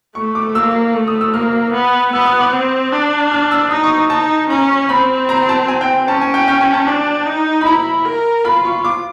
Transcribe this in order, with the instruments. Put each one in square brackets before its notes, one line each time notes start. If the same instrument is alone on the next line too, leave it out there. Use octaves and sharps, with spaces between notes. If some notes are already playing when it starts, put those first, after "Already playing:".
[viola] A3 [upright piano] C#6
[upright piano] D6
[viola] A#3 [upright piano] E6
[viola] A3
[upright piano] D#6
E6
[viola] A#3 [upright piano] F6
[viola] B3
[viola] B3 [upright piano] E6
[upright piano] D#6
D6
[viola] C4
D4
[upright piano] F6
E6
[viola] D#4 [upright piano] D#6
[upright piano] C#6
[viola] D#4 [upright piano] A5
[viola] C#4 [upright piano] A#5
[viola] C4 [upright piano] B5
[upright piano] A#5
A5
G#5
G5
[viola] C#4 [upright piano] A5
[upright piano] G#5
G5
G5
G#5
A5
[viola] D4
D#4
[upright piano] B5
[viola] E4 [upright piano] A#5
[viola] A#4
[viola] F4 [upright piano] B5
[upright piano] C#6
D6